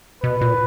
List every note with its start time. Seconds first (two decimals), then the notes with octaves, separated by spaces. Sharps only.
0.23 B2 B4
0.41 A#2